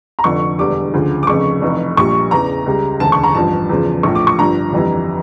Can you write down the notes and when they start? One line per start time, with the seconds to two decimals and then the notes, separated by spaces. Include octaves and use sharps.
0.19 A#5
0.24 F1 F2 D3 F3 C#6
0.59 E1 E2 D3 G3 D6
0.94 D2 C#3 F3
1.23 D6
1.27 F1 F2 C#3 C#6
1.62 F1 F2 E3
1.97 A#1 A#2 G3 C#6
2.31 E2 C#3 E3 A#5
2.66 C#2 C#3 G3
3.00 E1 D2 C#3 A5
3.12 C#6
3.23 A#5
3.35 A1 G2 F3 A5
3.69 E2 C#3 F3
4.03 A#1 A2 F3 C#6
4.15 D6
4.27 C#6
4.39 G1 G2 F3 A#5
4.73 G1 F2 E3 G3